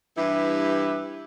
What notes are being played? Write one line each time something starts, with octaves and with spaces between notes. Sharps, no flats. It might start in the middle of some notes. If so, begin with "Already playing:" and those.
G2 E3 E4 G4 B4 E5